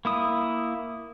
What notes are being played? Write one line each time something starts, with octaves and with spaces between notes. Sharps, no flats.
A#3 E4 D#6